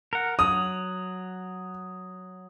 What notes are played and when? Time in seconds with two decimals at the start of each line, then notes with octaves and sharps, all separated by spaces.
0.13 A#4 F#5
0.39 F#3 D#6